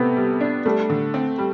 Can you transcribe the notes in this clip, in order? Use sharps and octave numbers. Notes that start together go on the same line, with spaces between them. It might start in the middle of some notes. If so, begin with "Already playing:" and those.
Already playing: C3 A3 B3 C4
G3
D4
G3 A3
D3
C4
G3